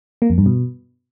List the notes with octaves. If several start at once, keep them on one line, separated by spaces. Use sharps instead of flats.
A#3
F2
G2
B2